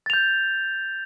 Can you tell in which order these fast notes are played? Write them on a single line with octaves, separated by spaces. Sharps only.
A6 F7 G6